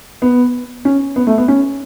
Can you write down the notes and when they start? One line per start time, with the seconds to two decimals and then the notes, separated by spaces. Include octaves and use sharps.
0.22 B3
0.85 C#4
1.16 B3
1.27 A3
1.38 B3
1.48 C#4